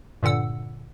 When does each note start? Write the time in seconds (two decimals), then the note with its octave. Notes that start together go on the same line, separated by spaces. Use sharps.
0.23 G2 A#2 D3 F#5 E6